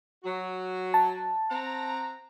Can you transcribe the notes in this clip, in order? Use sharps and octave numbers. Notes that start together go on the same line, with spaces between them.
F#3 F#4
A5
C4 F#5 A#5